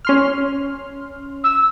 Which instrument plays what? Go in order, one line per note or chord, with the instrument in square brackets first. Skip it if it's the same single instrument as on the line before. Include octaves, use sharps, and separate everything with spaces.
[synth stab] C#4 C6 F6
[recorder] E6